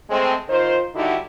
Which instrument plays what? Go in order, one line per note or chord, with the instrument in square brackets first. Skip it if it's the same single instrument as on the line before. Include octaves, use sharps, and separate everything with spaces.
[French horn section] G#3 A3 C4
D#3 D#4 F4 C5
D3 D#3 G3 D#4 E4 F#4